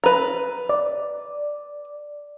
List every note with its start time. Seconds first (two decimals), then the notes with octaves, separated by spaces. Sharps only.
0.04 B4 A#5
0.69 D5